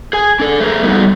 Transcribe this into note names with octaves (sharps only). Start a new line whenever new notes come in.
G#4 G#5
D4 A4
A3 G#4 A#4
G3 B3 D#4 F4 F#4 A4